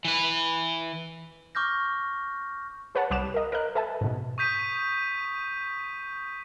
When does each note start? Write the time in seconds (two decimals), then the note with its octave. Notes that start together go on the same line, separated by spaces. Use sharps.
0.05 E3 B4
1.55 C#6 D6 F6 G6 A#6
2.95 G#4 B4 C#5 F#5 A5
3.10 C2 G3 B5 D6 F#6 E7
3.34 A#4 D#5
3.52 A#4 B4 D#5 F#6
3.75 A4 B4 E5 G#5 A5
4.01 G#2 B2
4.38 C#6 D#6 G6 B6 D#7